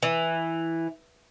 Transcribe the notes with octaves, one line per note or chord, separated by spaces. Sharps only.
E3